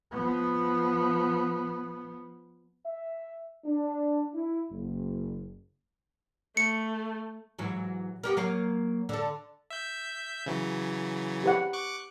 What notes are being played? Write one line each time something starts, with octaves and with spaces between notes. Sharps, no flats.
F3 B3
E5
D4
E4
F#1
A3 C#7
G#2 E3 F#3
B3 G4 A#4
F#3 A#3 F5
D3 A4
E5 G6
C#3 E3 F#3
G4 B4 F#5
C#6 D6 F#6